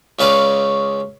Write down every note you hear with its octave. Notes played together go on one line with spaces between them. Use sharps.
C#2 C#3 B4 D5 F5